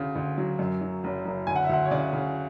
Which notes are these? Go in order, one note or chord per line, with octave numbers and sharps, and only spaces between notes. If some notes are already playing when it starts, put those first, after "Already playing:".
Already playing: D2 C#3
D2
F#3
F#2
F#3
F#1
F#1
D2 G#5
F#5
E5
D2 F#5
C#5
C#3 D5
C#3